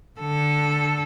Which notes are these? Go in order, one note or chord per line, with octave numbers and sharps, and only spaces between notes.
D3 A4